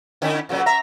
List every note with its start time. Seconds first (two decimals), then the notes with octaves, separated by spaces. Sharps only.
0.22 D3 C#4 E4
0.49 A#2 C#3 F#3
0.66 E5 A#5